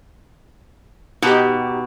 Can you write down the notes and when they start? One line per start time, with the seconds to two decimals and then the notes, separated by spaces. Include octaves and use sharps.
1.22 B2 D#4 G4